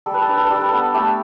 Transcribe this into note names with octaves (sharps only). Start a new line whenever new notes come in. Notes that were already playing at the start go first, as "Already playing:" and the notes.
G3 A4
B4
A4
D4 B4
A4
B4
G3 A4
B4
B3 A4
A3 G4